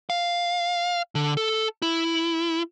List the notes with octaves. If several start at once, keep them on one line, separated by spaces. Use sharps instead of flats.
F5
D3
A4
E4